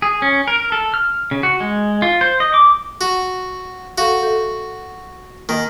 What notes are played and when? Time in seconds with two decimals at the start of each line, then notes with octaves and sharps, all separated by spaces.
0.02 G#4
0.22 C#4
0.48 A#4
0.72 A4
0.94 F6
1.31 C#3
1.43 F#4
1.60 G#3
2.02 F4
2.21 C5
2.40 D#5
2.54 D6
3.01 F#4
3.98 F#4 A4 F5
4.23 A4 E5
5.49 D#3 A#3 D#5